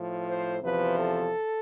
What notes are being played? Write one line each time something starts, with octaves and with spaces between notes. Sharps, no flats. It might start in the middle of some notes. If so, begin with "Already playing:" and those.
Already playing: A2 F3
C5
E2 C3 F3 B4
A4